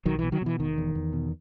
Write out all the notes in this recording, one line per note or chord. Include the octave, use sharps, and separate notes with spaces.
B1 D#3 F#3
E3
B2
D#3 F#3
B2 E3
E1 D#3
E2
E2
B2